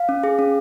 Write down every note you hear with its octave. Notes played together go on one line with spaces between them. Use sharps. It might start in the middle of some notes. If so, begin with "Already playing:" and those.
Already playing: F5
C#4
G#4
C#4